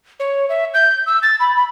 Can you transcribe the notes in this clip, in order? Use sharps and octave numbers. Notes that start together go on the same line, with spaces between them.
C#5
E5
G6
E6
A6
B5
B5